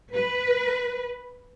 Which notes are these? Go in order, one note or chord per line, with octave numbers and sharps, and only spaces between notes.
B4